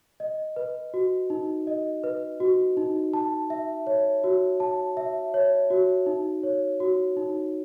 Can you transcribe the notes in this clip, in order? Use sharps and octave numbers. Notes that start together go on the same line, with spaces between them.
D#5
B4
F#4
D#4
D#5
B4
F#4
D#4
A5
E5
C#5
F#4
A5
E5
C#5
F#4
D#4
C#5
F#4
D#4